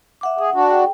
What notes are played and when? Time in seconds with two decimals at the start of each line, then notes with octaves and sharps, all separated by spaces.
0.21 E5 F#5 D6
0.38 G#4 F#5
0.54 D4 F#4
0.71 G#4 G5